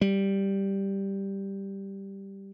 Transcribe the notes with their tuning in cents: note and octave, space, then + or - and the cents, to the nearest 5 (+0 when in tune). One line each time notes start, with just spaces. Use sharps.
G3 +0